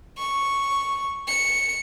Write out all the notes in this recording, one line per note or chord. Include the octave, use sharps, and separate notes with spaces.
C#6
C#7